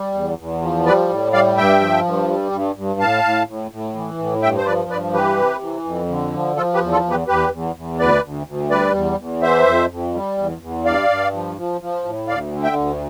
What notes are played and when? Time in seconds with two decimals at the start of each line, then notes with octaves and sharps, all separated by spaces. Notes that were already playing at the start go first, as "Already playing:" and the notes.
Already playing: G3
0.14 E2
0.38 E2
0.61 F3
0.86 G3 B4 D5
1.09 A2
1.33 G3 D5 F5
1.57 G2 E5 G5
1.80 F3
2.05 G2
2.28 G3
2.52 G2
2.76 G2
3.00 A2 F5 A5
3.24 A2
3.47 A2
3.71 A2
3.95 E3
4.18 A2
4.42 G2 E5 G5
4.57 C5
4.66 F3 B4 D5
4.90 G2 B4 D5
5.13 E3 G4 B4
5.37 C3
5.62 E3
5.85 F2
6.09 D3
6.33 F3
6.56 F3 F4 A4
6.74 G4 B4
6.81 E2
6.92 F4 A4
7.04 E2
7.10 G4 B4
7.28 E2 G4 B4
7.52 E2
7.76 E2
7.99 D2 B4 D5
8.24 D2
8.47 D2
8.70 G3 B4 D5
8.94 E2
9.18 E2
9.42 E3 C5 E5
9.66 F2
9.91 F2
10.14 G3
10.38 E2
10.61 E2
10.85 G2 D5 F5
11.09 G2
11.33 F3
11.56 F3
11.81 F3
12.05 A2
12.28 D2 D5 F5
12.52 D3
12.63 E5 G5
12.76 D2